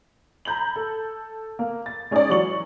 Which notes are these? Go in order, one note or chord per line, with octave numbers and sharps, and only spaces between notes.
A#5 B5 G6 G#6 F#7
A4
A#3
A6
G#3 C#4 D#4 G#4 C#5 D5
E3 F#3 C#6 F#7